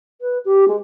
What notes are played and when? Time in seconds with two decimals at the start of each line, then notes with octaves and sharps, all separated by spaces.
0.20 B4
0.45 G4
0.67 G#3